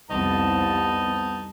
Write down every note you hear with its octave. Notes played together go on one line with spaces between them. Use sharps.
C2 F2 B3 D#4 A5